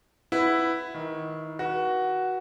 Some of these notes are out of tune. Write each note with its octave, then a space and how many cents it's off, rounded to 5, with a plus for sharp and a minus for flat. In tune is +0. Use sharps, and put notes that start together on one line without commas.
E4 +0 B4 +15 F#5 +0
D#3 +20 E4 +0
F#4 +5 B4 -40